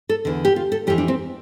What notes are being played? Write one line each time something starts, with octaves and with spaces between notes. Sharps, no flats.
A4
E2 D3
G4
F4
A4
F2 E3 G4
D4
C4